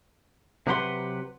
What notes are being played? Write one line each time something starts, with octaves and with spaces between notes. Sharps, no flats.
C3 F#3 G4 B4 F#5 C6